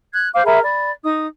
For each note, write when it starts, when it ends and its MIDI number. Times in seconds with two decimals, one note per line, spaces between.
0.13 0.28 90
0.13 0.28 92
0.33 0.43 72
0.33 0.43 77
0.33 0.43 86
0.46 0.59 68
0.46 0.59 70
0.46 0.59 76
0.46 0.59 83
0.64 0.90 74
0.64 0.90 83
1.04 1.27 63
1.04 1.27 87